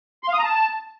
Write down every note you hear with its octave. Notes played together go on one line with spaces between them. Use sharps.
C6
F5
D#6
A#5
A5